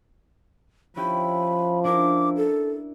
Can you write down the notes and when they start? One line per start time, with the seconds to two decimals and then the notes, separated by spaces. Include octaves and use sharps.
0.96 F3 C#4 E4 G4 B5
1.84 D4 E4 A#4 D6
2.37 A4